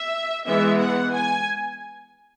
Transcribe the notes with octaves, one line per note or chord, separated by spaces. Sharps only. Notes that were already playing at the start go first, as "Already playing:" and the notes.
Already playing: E5
E3 G#3 B3 E5
F#5
G#5